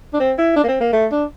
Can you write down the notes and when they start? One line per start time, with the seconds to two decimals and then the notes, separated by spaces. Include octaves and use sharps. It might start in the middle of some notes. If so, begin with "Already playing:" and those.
0.14 D4
0.20 C4
0.38 E4
0.56 D4
0.64 A#3
0.68 C4
0.80 A#3
0.93 A3
1.12 D4